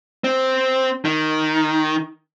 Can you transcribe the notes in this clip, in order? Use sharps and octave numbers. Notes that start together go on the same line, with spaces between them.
C4
D#3